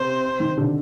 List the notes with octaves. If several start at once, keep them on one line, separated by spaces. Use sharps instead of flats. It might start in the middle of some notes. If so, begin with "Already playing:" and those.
Already playing: C3 C5
D#3
D3